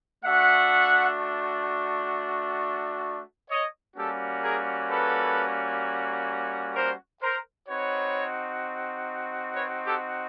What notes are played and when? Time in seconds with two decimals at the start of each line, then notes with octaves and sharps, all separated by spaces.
0.24 A3 D4 F#4 E5 F#5
3.50 C#5 D#5
3.96 G3 A#3 C#4 F#4 G4 A4
4.43 G#4 A#4
4.89 A4 B4
6.76 A#4 C5
7.22 A#4 C5
7.68 C4 D#4 F#4 B4 C#5
9.55 B4 C#5
9.85 G4 A4